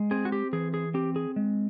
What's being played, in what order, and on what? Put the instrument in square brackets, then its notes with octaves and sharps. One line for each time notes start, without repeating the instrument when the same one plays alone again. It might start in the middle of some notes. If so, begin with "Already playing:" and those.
Already playing: [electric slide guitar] G#3
C4 G#4
F#4
G4
E3 G#4
G#4
C4 G4
G#4
G#3